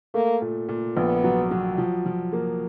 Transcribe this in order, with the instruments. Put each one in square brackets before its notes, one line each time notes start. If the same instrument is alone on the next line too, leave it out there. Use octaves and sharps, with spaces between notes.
[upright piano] A3 [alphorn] A#3
[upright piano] A#2
A#2
[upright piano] A#1 [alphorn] B3
[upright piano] F#3
F#3
F3
F3
A#3